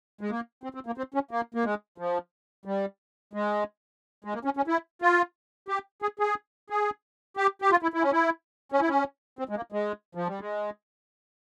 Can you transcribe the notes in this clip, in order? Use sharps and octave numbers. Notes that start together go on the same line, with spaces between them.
G#3
A#3
C4
C4
A#3
C4
C#4
A#3
A#3
G#3
F3
G3
G#3
G#3
A#3
C#4
C#4
E4
F4
G4
G#4
G#4
G#4
G4
G4
F4
E4
E4
C#4
E4
C#4
E4
C#4
C4
G#3
A#3
G#3
F3
G3
G#3